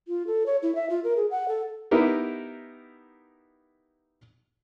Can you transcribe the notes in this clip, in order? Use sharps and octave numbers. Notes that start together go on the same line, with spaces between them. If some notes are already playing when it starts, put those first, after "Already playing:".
F4
A4
C#5
E4
E5
F4
A#4
G#4
F#5
A4
B3 D#4 E4 G4 A#4